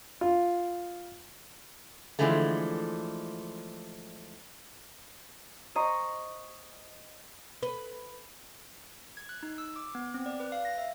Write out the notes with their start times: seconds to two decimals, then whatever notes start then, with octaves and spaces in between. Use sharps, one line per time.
0.21 F4
2.19 D3 E3 F3 G#3 A3
5.75 C5 D#5 A#5 C#6
7.63 B4
9.17 G#6
9.29 F#6
9.43 D#4
9.58 E6
9.76 D6
9.95 B3
10.14 C4
10.26 D5
10.40 B4
10.52 F5
10.65 A#6
10.78 E5